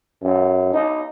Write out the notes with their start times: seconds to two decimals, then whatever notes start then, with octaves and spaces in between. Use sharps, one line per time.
0.23 F#2
0.74 D#4